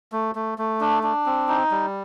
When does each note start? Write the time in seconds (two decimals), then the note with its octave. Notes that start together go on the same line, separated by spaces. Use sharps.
0.12 A3
0.35 A3
0.58 A3
0.81 D4
1.03 D4
1.26 C4
1.49 D#4
1.71 G3